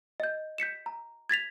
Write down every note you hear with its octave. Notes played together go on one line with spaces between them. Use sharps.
D#5 G6
G6 B6 C#7 E7
A#5
G#6 A6 B6 F7